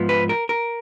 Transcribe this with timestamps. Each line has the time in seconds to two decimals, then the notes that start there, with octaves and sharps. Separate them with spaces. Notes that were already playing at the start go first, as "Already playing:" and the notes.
Already playing: G#2 F3 B3
0.09 B4
0.29 A#4
0.49 A#4